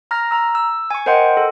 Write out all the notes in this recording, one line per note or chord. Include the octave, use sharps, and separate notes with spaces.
A#5 F6 A#6
A#5 E6
E6
G#5 C#6
A#4 C5 D#5 F#5 G5 C6
A4